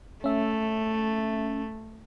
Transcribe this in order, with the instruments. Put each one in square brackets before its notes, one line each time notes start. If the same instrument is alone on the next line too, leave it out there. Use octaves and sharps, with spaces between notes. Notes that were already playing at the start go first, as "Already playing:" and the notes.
[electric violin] A3 [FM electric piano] C#4 E5